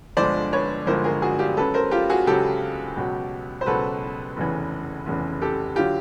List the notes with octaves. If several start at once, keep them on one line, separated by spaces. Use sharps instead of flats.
G1 G2 D3 F3 G#3 C5 D5
B4 C#5
G1 G2 D3 F3 G#3 A#4 C5
G#4 A#4
F#4 G#4
F4 G4
C#2 C#3 F#3 A4 B4
A#4 C5
F4 G4
F#4 G#4
C#2 C#3 F#3 G4 A4
C#2 B2 F#3
C5
C#2 B2 F#3 A4 B4
F1 E2 C#3 E3
F1 E2 C#3 E3
G4 A4
D3 F#3 F4 G4